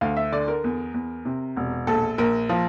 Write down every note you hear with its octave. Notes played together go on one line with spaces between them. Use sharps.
D2 F5
E5
D3 D5
A#4
E2
E2
C3
E1
A#1 A4
A#1 A#4
F3